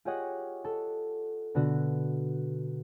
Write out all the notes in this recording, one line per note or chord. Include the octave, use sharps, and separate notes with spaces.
F4 G4 G#4 C#5 D#5 F#5
A4
B2 D3 B3 F#4